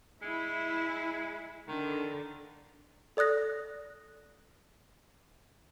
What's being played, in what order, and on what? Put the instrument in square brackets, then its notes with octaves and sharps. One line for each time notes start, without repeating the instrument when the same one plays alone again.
[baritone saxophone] G#3 [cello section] E4
[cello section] D3 [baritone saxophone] D#3
[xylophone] A4 D5 D#6 F#6 A#6